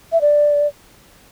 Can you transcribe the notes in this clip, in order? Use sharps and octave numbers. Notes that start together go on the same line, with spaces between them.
E5
D5